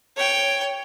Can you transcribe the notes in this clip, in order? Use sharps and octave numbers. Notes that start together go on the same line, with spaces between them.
C#5 G5